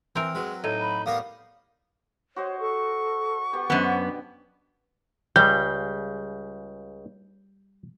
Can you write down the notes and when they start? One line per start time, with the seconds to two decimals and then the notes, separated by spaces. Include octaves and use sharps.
0.16 E3 C4 A#4
0.35 F#3 G#3 B4
0.64 A2 D#4
0.81 B5
1.06 G3 B3 A#4 C#5 F5
2.36 F#4 C5 C#5 D#5
2.60 A4 C#6
3.53 B3 G4
3.70 F#2 B2 D3 B3 C5
5.36 C#2 C#3 G3 G6